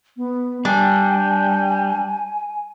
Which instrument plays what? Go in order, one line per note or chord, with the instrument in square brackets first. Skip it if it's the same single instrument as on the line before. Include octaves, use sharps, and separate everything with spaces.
[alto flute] B3
[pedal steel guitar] G3 [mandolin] D4 [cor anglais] G5 [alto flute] G#5